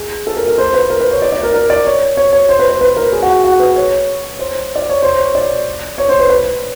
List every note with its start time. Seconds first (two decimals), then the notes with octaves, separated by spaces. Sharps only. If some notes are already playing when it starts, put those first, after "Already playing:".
Already playing: G#4
0.27 A4
0.37 A#4
0.48 A#4
0.58 C5
0.74 B4
0.90 A#4
1.01 B4
1.11 C#5
1.22 D5
1.32 D5
1.43 A#4
1.54 A#4
1.70 D5
1.85 C#5
2.17 C#5
2.33 C#5
2.49 C5
2.59 B4
2.69 C5
2.81 B4
2.97 A#4
3.12 G#4
3.22 F#4
3.44 F#4
3.60 B4
3.76 C#5
4.39 C5
4.76 D5
4.89 C#5
5.02 C5
5.19 C#5
5.35 D5
5.98 C#5
6.09 C5
6.19 B4
6.30 B4